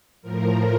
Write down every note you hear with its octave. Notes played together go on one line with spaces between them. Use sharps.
A2 F3 A#4